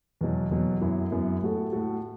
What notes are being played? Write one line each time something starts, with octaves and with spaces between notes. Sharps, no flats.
E2 B2 F#3
E2 B2 F#3
F#2 F#3 B3 E4
F#2 F#3 B3 E4
A2 A3 F#4 A4
A2 A3 F#4 A4